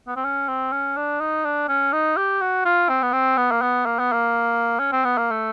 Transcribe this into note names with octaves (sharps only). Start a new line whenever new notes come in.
B3
C4
C#4
C4
C#4
D4
D#4
D4
C#4
D#4
G4
F#4
F4
C4
B3
C4
B3
A#3
B3
A#3
B3
A#3
C#4
C4
B3
A#3
A3